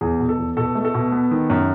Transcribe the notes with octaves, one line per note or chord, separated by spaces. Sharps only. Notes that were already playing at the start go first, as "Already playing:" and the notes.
E2 G#4
B2
A4
E2
B2 A4
A3
A4
B2
B3
D#3
F#2